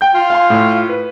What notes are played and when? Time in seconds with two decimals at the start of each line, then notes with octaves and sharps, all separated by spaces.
0.01 G5 G6
0.14 F4
0.30 F5 G#5 C6
0.50 A2
0.89 B4